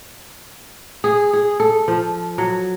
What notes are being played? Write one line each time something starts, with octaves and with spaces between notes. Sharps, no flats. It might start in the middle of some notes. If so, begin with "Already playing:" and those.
G#4
G#4
A4
F3
F#3